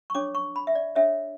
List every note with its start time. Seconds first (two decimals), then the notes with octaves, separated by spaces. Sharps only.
0.10 C#6
0.15 D4 A4 C#5 D6
0.35 C#6
0.56 B5
0.67 E5
0.75 D5
0.95 D4 A4 C#5 E5